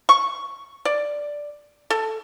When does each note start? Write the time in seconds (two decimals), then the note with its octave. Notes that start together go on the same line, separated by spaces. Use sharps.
0.09 C#6
0.85 D5
1.90 A4